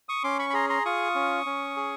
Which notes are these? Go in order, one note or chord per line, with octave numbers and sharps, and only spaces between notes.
C#6 D#6
C#4 C6 D6
B5 C#6
B5
G#4 A#5 C6
A#5 C6
F4 C#6 D#6
C#4
C#4
G#4